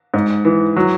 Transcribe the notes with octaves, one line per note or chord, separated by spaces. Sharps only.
G#2
E3
F#3